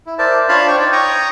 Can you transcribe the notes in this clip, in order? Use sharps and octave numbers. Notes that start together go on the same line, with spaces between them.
E4
A#4 C5 D5 E5 A5
D4 F4 C#5 F5 A5 B5
C5 C#5 G5 C#6
D#4 D5
C#5 G5 A#5 C#6 D#6